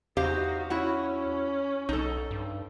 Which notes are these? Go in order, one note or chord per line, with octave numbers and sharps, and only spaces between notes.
E2 D#4 F#4 G4 C5 F5
C#4 E4 F#4 F#5
B1 D#4 A4
G2